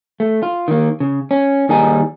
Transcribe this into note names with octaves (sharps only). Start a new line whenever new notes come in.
A3
F4
D#3 A#3
C#3
C#4
D#2 D#3 G3 D#4 G#4 G#5